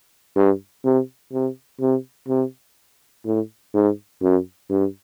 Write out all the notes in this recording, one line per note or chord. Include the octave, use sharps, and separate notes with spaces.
G2
C3
C3
C3
C3
A2
G#2
F#2
G2